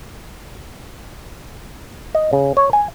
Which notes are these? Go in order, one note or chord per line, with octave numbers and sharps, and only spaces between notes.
D#5
C#3
C#5
G#5